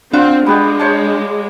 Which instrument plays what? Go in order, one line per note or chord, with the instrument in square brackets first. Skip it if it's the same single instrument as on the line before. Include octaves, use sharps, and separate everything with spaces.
[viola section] C4 [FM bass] D4 [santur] F4 F#5
[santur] G3 B3 G4 [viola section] G#3
[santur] C5 C#5 A5